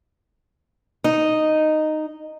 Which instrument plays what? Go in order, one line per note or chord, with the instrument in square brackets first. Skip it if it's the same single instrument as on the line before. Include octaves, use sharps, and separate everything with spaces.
[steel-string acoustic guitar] D#4 D#5